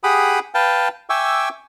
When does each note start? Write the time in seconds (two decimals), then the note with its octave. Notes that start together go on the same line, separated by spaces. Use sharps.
0.04 G4 G#4 F#5 B5 D#6
0.55 B4 F5 G5 A5
1.10 E5 G5 G#5 C#6 D6 E6